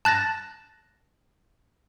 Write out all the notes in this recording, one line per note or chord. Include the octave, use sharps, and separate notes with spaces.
A5 F#6 A6 A#6